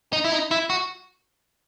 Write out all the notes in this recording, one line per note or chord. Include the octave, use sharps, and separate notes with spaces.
D#4
E4
D#4
E4
F#4